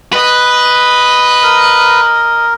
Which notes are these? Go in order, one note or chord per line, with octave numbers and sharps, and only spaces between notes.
B4 D#5
A#4